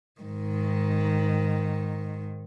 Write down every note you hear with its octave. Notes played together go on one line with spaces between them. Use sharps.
G#2 D#3